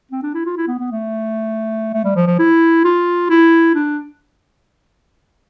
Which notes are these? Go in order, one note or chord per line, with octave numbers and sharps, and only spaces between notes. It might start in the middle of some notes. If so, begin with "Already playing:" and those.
C4
D4
E4
F4
E4
B3
B3
A3
A3
G3
F3
F3
E4
F4
E4
D4